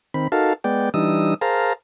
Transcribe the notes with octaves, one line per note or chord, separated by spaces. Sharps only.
D#3 C4 B5
D#4 F#4 A4 A#4 F5 A5
G#3 B3 D5 G5
E3 G3 D4 D#4 D#6 E6
G#4 A#4 C5 F5 A5 A#5